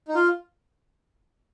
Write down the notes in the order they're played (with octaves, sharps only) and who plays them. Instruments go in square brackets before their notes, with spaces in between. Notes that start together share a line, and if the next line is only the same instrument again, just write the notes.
[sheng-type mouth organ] D#4
F4